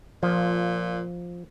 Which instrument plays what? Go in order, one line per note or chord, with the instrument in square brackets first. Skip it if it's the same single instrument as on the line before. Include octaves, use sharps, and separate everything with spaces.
[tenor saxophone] A#2 [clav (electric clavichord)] F3